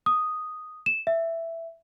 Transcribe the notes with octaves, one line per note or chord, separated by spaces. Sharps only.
D#6
E7
E5